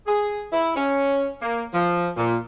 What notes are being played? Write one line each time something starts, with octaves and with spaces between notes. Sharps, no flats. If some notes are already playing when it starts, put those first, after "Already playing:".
G#4
E4
C#4
A#3
F3
A#2